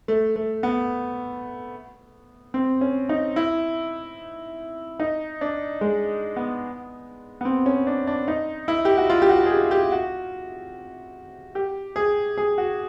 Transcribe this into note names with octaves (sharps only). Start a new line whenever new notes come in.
A3
A3
B3
C4
C#4
D#4
E4
D#4
D4
G#3
B3
B3
C4
C#4
D4
D4
D#4
E4
G4
F#4
F4
G4
F#4
G#4
G4
G4
F#4
G4
G#4
G#4
F#4